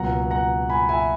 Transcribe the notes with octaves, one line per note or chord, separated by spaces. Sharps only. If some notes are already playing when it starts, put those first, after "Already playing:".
Already playing: C#2 B2 F#3 A#3 F#5 A#5
F#5 A#5
G#5 B5
E5 G#5